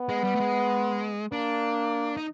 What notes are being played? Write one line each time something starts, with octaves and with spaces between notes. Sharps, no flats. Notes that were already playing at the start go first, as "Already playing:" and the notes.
Already playing: B3
G#3
G3
A3
G#3
A#3 D4
D#4